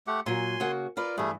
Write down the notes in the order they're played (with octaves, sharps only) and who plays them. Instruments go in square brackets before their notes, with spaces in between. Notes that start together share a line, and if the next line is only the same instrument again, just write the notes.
[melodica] A3 G4 F#5
[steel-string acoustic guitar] A#2 F#3 [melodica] G#5 C6
[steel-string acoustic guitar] C#3 A#3 F#4
[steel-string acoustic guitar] F4 B4 D5 [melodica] A#4
[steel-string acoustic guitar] G2 E3 [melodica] G3 A3 G#4